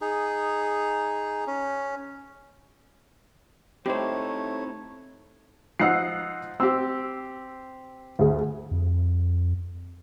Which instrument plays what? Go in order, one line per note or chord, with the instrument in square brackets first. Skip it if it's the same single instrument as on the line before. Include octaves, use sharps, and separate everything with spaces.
[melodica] D#4 G#4
C#4
[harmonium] A3 C#5 [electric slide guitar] C4 D#4 E4 [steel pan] G4 C5
[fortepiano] F3 D#4 F#5 [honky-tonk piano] E6 F#6 C7
[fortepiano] C4 G4 [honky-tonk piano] E6
[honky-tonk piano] D2 G#4
[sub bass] F2